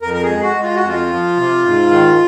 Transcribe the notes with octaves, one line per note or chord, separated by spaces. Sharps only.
F2 A#4
A#4
G#4
G#3
F#4
G#3
F4
F#4
F2
F4
F3
C3
G#2
D#3